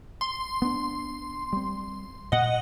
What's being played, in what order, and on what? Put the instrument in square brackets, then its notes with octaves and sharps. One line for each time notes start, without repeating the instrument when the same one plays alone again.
[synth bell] C6
[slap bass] B3 D4
G3 C4
[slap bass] A#2 [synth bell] D#5 F#5